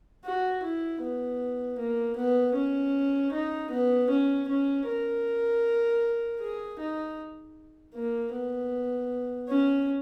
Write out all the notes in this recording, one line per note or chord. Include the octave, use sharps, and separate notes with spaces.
F#4
E4
B3
A#3
B3
C#4
D#4
B3
C#4
C#4
A#4
G#4
D#4
A#3
B3
C#4